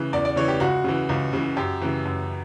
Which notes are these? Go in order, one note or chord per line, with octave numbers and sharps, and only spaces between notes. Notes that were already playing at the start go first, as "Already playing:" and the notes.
Already playing: C#3 E3
E2 D5
D5
C#3 E3 C#5
G4
C#2 F#4
C#3 E3
C#2
C#3 E3
F#2 G4
C#3 E3
F#2